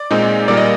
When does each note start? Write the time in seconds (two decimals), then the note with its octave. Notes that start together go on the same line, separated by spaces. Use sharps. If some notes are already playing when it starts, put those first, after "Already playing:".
Already playing: D5
0.11 A#2 G#3 C4 D#4
0.48 A#2 G3 A#3 D5
0.57 D#5